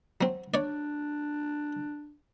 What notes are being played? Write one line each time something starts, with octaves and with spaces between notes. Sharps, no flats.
F#3 C4
D4 C#5 D5